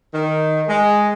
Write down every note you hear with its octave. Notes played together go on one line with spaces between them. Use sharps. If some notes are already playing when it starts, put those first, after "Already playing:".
D#3
G#3